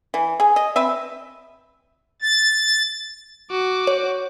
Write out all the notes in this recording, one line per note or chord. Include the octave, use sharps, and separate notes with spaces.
E3
G#4
D#5
C4 B4 E5
A6
F#4 D6
C#5